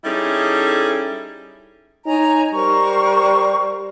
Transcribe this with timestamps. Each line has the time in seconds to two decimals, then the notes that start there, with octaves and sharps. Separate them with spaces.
0.03 G3 C#4 D#4 E4 G#4 A4
2.06 D#4 C#5 G#5 A#5
2.54 G3 A#4 C5 C#6